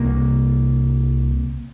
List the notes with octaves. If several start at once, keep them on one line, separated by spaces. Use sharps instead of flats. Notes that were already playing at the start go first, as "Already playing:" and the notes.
Already playing: C2 C3 A#3